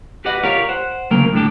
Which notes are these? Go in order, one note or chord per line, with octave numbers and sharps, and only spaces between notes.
F#4 G4 B4 D5 D#5 F#5
F4 G4 A#4 C#5 D5 F5
C5 F#5
D2 C#3 F#3 A#3 A#4 G5
A2 D3 G3 D4 G4